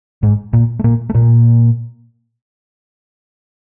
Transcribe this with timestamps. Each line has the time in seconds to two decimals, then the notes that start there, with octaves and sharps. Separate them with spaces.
0.23 G#2 G#3
0.53 A#2 A#3
0.79 A3
0.84 A#2 A#3
1.09 A3
1.14 A#2 A#3